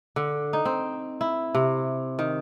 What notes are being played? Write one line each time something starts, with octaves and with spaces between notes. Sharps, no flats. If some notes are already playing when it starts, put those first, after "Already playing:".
D3
D#4
C4
E4
C3
D#3